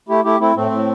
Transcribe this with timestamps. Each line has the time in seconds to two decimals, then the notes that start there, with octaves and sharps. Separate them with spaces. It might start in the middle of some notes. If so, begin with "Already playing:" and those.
0.09 A3 E4 G4
0.24 A3 E4 G4
0.40 A3 C4 E4
0.56 A2 A3 C4
0.71 A2